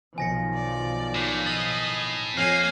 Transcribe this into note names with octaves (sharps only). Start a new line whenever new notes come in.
B1 D#3 F3 G#5 A#6 C#7
D5
A2
D#5 A6 F#7
F2 A#3 C#5 G#5 F6 G6 C7